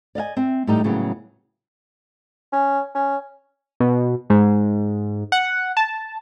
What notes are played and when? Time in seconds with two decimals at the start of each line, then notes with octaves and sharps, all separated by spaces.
0.15 D5 D#5 F5 G#5
0.37 C4 E5
0.67 A2 E3 G3 D#4 G4
0.84 A2 C#3 F#3 G3 A#3 B3
2.53 C#4
2.95 C#4
3.80 B2
4.30 G#2
5.32 F#5
5.77 A5